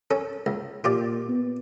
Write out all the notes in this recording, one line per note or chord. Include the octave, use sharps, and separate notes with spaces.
C#4 A4
C#2
A#2 F4 G4 D5
B3